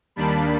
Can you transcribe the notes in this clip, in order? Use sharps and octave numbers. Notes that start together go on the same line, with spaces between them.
D#2 D#3 G3 A#3 D4 A5 B5